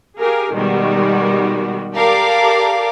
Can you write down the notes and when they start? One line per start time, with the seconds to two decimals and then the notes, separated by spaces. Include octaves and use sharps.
0.18 G4 G#4 A#4 F5 G#5
0.53 B2 D#3 G3 G#3 B3 F#4
1.95 G4 A4 A#4 D5 F5 D6